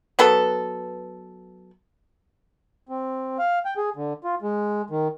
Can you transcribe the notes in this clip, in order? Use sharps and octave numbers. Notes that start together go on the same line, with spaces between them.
F#3 B3 A4
C4
F5
G5
G#4
D3
F4
G#3
D#3